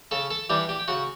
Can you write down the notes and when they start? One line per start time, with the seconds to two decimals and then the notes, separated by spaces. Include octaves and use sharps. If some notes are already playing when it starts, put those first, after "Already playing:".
0.11 C#3 A4 A5
0.30 A4 A5
0.49 E3 G3 D4 G4 G5
0.69 G4 G5
0.80 G5
0.88 C#3 F#4 F#5